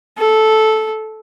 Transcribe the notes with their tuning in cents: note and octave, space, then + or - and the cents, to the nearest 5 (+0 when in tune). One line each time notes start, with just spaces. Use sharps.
A4 -10